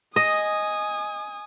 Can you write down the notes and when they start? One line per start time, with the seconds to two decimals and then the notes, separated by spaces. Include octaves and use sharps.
0.16 D#5 G#5 D#6